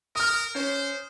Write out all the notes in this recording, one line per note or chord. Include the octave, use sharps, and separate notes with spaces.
A#4 D#6 F6
C#4 C5